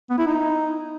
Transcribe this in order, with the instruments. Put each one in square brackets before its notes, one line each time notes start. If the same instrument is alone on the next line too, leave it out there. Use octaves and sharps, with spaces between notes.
[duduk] B3
E4
D#4